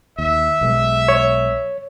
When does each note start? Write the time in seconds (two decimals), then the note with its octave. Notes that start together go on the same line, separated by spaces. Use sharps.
0.18 D#2 E5
0.61 B1 B2 G#3
1.08 C#5